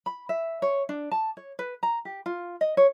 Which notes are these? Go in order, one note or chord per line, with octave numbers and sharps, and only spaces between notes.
B5
E5
C#5
D4
A5
C#5
B4
A#5
G4
F4
D#5
C#5